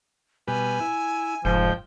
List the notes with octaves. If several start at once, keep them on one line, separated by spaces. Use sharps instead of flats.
B2 G3 B4 G#5
E4
F1 G#2 F3 G5